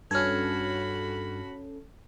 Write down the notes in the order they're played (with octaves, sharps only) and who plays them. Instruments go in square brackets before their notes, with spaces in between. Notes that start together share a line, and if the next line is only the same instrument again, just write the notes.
[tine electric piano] G2 [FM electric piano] C#4 A4 [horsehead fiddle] F#4 B5 [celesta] F6 G#6